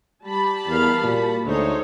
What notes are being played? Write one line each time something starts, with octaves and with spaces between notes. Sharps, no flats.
G3 A5 B5
E2 A#4 F5
A#2 F#4
D2 G#3 D#4 A4 C5 C#5